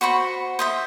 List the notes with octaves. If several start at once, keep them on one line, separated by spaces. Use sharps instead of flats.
F#4 C5 B5 C#6
C5 D#5 E5